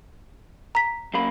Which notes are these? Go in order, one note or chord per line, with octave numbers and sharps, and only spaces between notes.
A#5 B6
F#2 A#3 B5